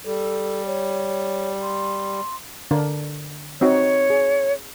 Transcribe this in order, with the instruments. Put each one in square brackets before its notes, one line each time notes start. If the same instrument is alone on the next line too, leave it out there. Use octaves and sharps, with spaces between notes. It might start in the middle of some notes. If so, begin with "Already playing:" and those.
[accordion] G3 [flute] A4
[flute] C#5
C6
[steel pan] D3 D4 A#4
[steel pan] C4 D#4 F#4 [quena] C#5
[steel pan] G#4